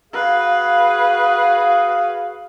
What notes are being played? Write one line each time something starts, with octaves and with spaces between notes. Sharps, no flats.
F#4 G#4 B4 F5